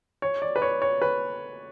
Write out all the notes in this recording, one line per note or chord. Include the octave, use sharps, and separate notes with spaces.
C#5
D5
B4
C#5
C#5
B4